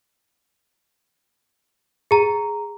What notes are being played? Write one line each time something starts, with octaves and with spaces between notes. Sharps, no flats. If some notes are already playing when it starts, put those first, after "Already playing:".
G#4 A#5